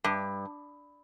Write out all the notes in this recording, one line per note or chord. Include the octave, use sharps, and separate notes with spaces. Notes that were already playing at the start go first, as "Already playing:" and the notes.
G2